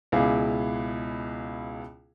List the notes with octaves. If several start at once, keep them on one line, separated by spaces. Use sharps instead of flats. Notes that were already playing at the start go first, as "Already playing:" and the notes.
C#2 B2 E4 G#4 F5 D6